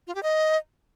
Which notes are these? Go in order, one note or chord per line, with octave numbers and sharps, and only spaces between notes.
F4
G4
D#5